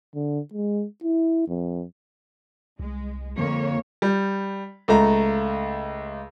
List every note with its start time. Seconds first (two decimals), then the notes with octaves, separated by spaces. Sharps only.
0.15 D3
0.54 G#3
1.04 E4
1.48 F2
2.79 C2 G#3
3.38 F2 D3 A#3 C#5
4.02 G3
4.88 C#2 A3 A#5